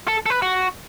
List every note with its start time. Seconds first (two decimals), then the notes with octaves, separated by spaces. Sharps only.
0.08 A4
0.26 A4
0.30 B4
0.42 F#4